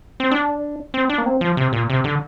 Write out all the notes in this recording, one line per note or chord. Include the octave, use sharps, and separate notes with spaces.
C4
D4
C4
D4
A#3
C4
F3
C3
A#2
C3
D3